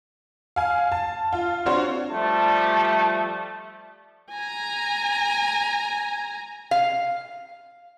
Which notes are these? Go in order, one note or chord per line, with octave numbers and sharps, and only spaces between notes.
F5 G#5
A5
F4
C4 D4 F#4 C5 C#5
F3 G3 A3 A5
G#5 A#5
F5